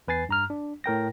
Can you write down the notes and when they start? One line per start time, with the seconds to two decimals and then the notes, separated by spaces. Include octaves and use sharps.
0.08 E2 B4 G#5 A6 C7
0.29 G2 A#5 F6
0.50 D4
0.84 A2 A#4 G5 A#6